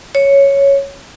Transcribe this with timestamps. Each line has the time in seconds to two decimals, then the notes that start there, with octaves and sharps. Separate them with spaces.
0.15 C#5